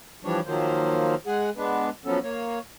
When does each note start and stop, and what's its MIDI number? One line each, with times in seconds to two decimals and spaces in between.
0.24 0.40 52
0.24 0.40 53
0.24 0.40 55
0.24 0.40 62
0.24 0.40 73
0.46 1.15 51
0.46 1.15 53
0.46 1.15 54
0.46 1.15 58
0.46 1.15 72
1.27 1.50 56
1.27 1.50 68
1.27 1.50 78
1.27 1.50 80
1.57 1.90 56
1.57 1.90 59
1.57 1.90 62
1.57 1.90 71
2.06 2.19 53
2.06 2.19 54
2.06 2.19 59
2.06 2.19 61
2.06 2.19 69
2.23 2.59 58
2.23 2.59 73